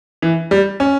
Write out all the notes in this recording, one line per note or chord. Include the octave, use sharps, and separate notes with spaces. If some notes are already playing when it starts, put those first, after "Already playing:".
E3
G3
C#4